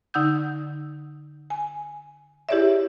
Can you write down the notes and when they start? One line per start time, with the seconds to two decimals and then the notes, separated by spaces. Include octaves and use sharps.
0.14 D3 D#4 F#5 E6 G6
1.50 G#5
2.49 E4 G4 G#4 C#5 D5 E5